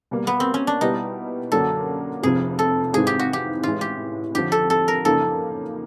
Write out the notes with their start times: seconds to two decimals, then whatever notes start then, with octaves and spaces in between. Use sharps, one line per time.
0.11 B2 G3 A#3
0.27 B3
0.40 C4
0.54 C#4
0.67 D4
0.81 B2 G3 B3 D#4 E4 G4
1.52 F#2 D3 F#3 A#3 D4 A4
2.23 F1 F2 C3 F3 G#4
2.59 A4
2.93 G#1 G#2 E3 G#3 C4 G#4
3.07 G4
3.19 F#4
3.33 G4
3.63 A1 A2 E3 G#3 F4
3.81 G4
4.35 F2 D3 F3 G4
4.52 A4
4.70 A4
4.88 A#4
5.05 F#2 C#3 F3 A#3 D#4 A4